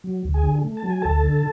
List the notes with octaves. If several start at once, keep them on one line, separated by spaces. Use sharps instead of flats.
F#3
D2
G#4 G#5
D3
A3
A5
F#3
G#5
D2 A4 A5
D3